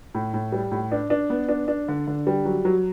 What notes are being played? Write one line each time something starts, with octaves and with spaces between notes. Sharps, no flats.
A2
A2
G3
A2
D4
D4
B3
D4
D4
D3
D3
G3
F#3
F#3